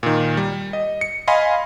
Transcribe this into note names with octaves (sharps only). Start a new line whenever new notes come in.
A#2 D#3
G3
D#5
C#7
D#5 F5 G#5 B5 C6